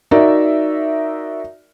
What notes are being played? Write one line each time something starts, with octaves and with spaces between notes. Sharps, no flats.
D#4 F#4 A#4 D5 E5